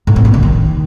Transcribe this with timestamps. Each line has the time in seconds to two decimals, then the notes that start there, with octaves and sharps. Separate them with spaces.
0.07 A2
0.16 C4
0.25 A#3
0.34 D3
0.43 D#3